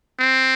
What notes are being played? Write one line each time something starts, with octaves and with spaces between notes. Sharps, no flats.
C4